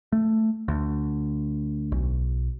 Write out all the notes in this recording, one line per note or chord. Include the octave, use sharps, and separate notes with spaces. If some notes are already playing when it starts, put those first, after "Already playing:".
A3
D2
B1